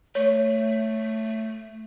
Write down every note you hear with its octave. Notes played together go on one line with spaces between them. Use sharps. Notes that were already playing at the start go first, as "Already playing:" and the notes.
A3 C#5